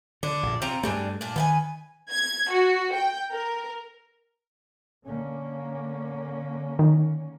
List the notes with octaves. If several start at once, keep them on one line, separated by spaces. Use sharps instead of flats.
D3 D4
A#1 F#2
C3 C4 F4 A#5
G2 G3 A3 D4 G#4
A#2 D4
D#3 B4 G5 G#5
G#6
F#4
G5
A#4
D3 A#3 C#4
D#3